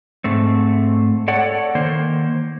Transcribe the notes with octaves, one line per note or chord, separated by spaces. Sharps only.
G#2 A3 C4
A4 C#5 D5 F#5
D#3 A#3 C5